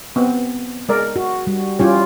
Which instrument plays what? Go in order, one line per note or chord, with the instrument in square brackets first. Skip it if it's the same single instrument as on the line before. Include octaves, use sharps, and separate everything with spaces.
[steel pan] B3 C4
G#3 A#4 D5
[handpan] F#4
G3
[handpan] G3 E4 F4 [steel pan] C#4 G4 C#5